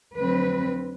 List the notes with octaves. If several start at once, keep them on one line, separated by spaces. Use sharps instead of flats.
F2 D3 F#3 A3 C4 B4